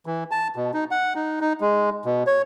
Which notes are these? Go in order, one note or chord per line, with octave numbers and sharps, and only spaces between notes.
E3
A5
B2
D#4
F#5
D#4
D#4
G#3
B2
C#5